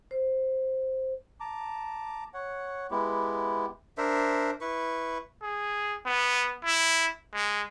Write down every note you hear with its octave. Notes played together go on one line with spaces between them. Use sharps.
C5
A5 A#5 D6
C#5 F#5
G#3 B3 E4 G4
D4 A#4 C5 E5
E4 B4 C#6
G#4
B3
E4
G#3